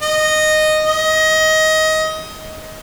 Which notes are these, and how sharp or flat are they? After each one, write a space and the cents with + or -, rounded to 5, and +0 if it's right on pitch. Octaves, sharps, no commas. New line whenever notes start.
D#5 -10
D#5 +20